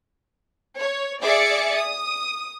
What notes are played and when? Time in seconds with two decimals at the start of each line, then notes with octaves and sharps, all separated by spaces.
0.81 C#5
1.22 G#4 D5 E5 D6 A6 C#7
1.75 D#6